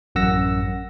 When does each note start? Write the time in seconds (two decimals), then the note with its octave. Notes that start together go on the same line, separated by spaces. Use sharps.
0.15 A1 F#2 F#5 E6 A#6